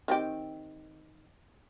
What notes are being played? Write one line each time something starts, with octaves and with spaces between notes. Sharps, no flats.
D#3 C4 G4